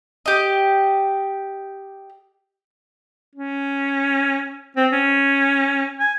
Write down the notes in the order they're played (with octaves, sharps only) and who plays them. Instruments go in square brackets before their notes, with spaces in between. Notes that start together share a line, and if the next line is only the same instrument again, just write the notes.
[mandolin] G4 D#5
[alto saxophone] C#4
C4
C#4
G#5